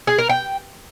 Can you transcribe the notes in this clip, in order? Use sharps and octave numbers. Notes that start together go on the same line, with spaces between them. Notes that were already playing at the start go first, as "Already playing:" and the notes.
G#4
A#4
G5